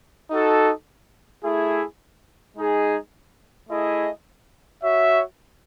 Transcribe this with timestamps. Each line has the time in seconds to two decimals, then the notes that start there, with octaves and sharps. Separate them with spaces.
0.30 D#4 F#4 A4
1.44 A3 E4 G#4
2.57 G#3 D#4 G#4
3.69 A3 E4 G#4 D#5
4.82 F#4 C#5 E5